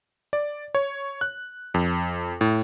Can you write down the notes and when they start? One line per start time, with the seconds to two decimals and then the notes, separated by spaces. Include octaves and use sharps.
0.33 D5
0.75 C#5
1.21 F#6
1.74 F2
2.41 A2